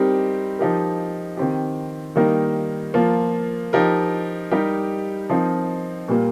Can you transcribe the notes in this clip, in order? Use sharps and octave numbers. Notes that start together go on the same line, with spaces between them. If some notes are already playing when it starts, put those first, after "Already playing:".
Already playing: G3 C4 D#4 G4 A#4
F3 D#4 G4 A#4
D#3 C4 G4
D#3 G3 A#3 D#4 A#4
F3 A#3 F4
F3 D#4 G4 A#4
G3 D#4 G4 A#4
F3 C4 D#4 A#4
A#2 G3 A#3